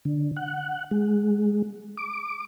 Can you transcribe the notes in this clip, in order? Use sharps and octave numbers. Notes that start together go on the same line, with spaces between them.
D3
F#5
G#3
D6